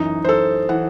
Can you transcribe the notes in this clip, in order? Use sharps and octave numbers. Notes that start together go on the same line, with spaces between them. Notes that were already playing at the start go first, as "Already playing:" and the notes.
Already playing: F#2 E3 D#4
C5
A4
E3 F#5